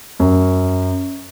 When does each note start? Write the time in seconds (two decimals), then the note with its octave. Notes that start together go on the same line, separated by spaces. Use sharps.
0.19 F#2